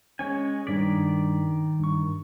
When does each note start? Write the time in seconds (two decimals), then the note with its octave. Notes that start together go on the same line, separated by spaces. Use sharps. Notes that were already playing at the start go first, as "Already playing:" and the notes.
0.19 G#3 C#4 C#5 G#5
0.67 G2 D#3 D5 B6
1.80 G2 C#6